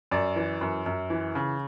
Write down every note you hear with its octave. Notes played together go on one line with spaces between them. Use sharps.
F#2 D5
E3
F#2
F#2
E3
C#3